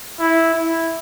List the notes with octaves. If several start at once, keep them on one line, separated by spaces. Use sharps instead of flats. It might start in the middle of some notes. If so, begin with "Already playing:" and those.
E4
E4